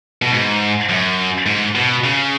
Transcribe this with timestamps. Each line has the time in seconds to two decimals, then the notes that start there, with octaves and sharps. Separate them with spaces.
0.22 B2
0.32 G#2
0.89 F#2
1.46 G#2
1.75 B2
2.04 C#3